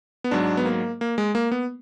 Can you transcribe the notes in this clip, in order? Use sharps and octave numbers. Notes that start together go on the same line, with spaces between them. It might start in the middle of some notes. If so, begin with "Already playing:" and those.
B3
G#2 F#3 D4
B3
A#3
A#3
G#3
A#3
B3